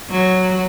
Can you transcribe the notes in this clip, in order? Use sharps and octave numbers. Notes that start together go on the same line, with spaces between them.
F#3